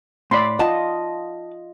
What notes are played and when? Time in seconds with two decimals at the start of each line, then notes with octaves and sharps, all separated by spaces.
0.31 A2 D5 B5 C6
0.59 F4 D#5 F#5 A5